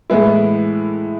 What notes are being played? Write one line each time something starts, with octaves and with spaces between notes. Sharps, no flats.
A2 E3 G#3 B3 E4